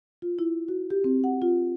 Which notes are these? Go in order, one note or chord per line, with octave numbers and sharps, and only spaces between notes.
F4
E4
F#4
G4
C4
F#5
F4